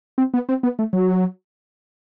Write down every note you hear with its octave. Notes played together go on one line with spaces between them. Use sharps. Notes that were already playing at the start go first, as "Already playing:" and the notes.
C4
B3
C4
B3
A3
F#3